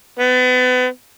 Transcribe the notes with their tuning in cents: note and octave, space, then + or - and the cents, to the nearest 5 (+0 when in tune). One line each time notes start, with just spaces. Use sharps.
B3 +35